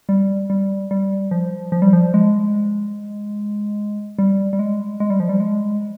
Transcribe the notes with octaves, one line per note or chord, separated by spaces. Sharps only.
G3
G3
G3
F3
F3
G3
F3
G#3
G3
G3
G#3
G#3
G3
F3
G3
G#3